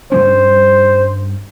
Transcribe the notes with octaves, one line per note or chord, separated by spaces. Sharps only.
G2 G3 C#4 C5